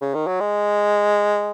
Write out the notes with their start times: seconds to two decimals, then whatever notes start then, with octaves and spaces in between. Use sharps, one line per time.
0.01 C#3
0.15 D#3
0.27 F#3
0.41 G#3